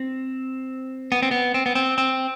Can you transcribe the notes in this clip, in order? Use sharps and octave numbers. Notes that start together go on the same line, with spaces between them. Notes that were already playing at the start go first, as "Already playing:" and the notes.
Already playing: C4
B3
C4
B3
C4
B3
C4
C4